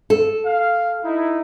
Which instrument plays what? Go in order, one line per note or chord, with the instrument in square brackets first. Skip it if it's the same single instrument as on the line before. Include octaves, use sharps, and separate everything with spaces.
[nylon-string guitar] A4
[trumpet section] F5
D#4 E4